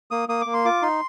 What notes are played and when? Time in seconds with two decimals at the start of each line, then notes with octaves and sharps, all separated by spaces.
0.11 A#3 D#6
0.29 A#3 D#6
0.41 A#3 D6
0.54 C6
0.65 F4 D6
0.82 D#4 C6